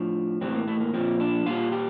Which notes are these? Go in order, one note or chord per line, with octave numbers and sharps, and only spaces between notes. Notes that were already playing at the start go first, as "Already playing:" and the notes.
Already playing: A2 F3 D4
A2 E3 G3 C4
A#3
A3
A#3
A#2 F3 C4
D4
A#2 G3 F4
G4